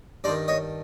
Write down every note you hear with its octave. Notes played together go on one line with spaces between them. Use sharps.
G2 D#3 C5 D5
C#5 D#5